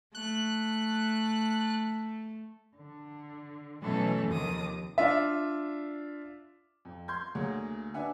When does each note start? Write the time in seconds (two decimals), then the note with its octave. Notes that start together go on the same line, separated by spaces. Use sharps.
0.15 A3 F#6
2.76 D3
3.82 B2 E3 F#3 A3 C#4 A4
4.28 D#2 C3 D#3 F3 D6 D#6
4.98 D4 F4 D5 E5
6.85 F2
7.08 C6 G6 G#6
7.35 D2 A#3 G#4 C#5 F#5
7.94 D4 B4 E5 F#5 G#5